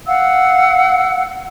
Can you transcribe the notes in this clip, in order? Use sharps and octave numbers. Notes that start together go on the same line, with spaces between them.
F5 F#5 E6